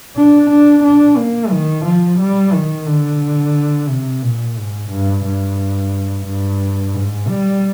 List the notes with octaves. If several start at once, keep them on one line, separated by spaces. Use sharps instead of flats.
D4
D4
D4
A#3
D#3
F3
G3
D#3
D3
C3
A#2
G#2
G2
G2
G2
G#2
G3